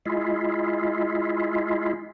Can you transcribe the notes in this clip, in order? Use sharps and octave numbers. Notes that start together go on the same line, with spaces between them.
G#3 E4 F4